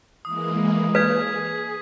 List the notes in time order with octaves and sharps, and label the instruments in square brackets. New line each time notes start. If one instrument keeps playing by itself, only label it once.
[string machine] E3 G#3 A#3 [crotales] D#6
[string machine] G#4 [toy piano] B4 [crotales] G#6 B6